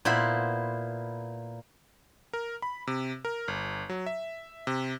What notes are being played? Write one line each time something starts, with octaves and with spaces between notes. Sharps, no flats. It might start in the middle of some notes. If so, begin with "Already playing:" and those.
A#2 B3 E4 C5 B5
A#4
B5
C3
A#4
G1
F#3
E5
C3